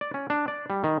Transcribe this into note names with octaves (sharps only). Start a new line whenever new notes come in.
D5
C#4
D4
D5
G3
D#3